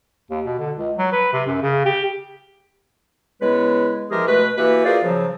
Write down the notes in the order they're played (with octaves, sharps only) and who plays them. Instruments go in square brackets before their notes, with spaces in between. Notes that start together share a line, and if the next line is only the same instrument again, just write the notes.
[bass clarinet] D#2
B2
D3
C#2
F#3
B4
C3
F#2
C#3
G4
[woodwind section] C#3 G#3 B3 E4 B4
E3 F3 G#3 G4 G#4 A#4
B2 A3 B4
E3 A#3 F#4 G4 B4
F4 F#4 G#4 A#4 C5 D5
C#3 F3 F#3